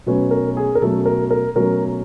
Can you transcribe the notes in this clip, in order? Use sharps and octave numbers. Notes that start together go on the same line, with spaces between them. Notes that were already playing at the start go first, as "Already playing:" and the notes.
B2 F#3 A3 C#4 B4
A#4
G#4
A#4
B2 F#3 A3 C#4 A4
A#4
A#4
B2 F#3 A3 C#4 A#4